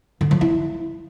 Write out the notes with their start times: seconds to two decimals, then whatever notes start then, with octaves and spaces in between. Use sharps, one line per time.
0.21 D3
0.31 F3
0.41 E4